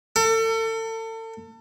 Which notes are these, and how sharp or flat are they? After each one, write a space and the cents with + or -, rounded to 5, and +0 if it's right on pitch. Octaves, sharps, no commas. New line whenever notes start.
A4 +35